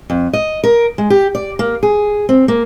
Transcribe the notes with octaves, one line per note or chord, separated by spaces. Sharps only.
F2
D#5
A#4
G#3
G4
D5
A#3
G#4
C4
A#3